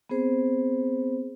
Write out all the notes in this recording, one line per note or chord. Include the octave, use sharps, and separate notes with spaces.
B3 C4 G#4 C5